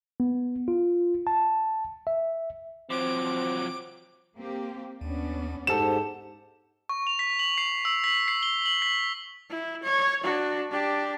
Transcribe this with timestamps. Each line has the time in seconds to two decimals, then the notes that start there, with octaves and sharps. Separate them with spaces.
0.20 B3
0.68 F4
1.27 A5
2.07 E5
2.90 F3 F#3 C4 D6
4.35 A#3 C4 G4
5.01 D#2 B3 C#4 D4
5.67 G#2 G4 A4 C5 F#5 E7
6.89 C#6
7.07 F7
7.19 B6
7.39 F#7
7.58 C7
7.85 E6
8.04 B6
8.28 C7
8.43 G7
8.66 F#7
8.82 B6
9.50 E4
9.83 C#5
10.23 D4 F#4
10.71 D4 G4